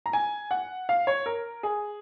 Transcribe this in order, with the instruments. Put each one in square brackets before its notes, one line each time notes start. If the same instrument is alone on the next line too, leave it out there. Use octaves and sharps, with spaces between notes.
[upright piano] A#5
G#5
F#5
F5
C#5
A#4
G#4